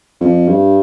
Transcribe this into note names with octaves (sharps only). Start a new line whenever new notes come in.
F2
G2